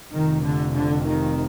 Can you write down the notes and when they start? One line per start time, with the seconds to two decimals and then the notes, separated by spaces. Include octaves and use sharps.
0.13 F1 F2 C3 D#3
0.44 D3
0.75 D3
1.06 D#3